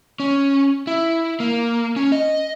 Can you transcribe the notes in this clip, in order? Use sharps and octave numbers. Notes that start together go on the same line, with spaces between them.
C#4
E4
A#3
C#4
D#5